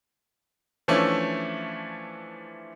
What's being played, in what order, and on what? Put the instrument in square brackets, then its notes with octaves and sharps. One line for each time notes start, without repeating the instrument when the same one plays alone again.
[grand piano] E3 F3 A3 C#4 D4 E4